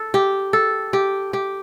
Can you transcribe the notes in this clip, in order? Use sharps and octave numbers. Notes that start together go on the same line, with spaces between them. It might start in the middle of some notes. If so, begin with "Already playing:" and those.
Already playing: A4
G4
A4
G4
G4